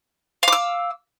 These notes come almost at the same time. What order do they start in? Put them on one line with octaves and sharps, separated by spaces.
F5 D6 E6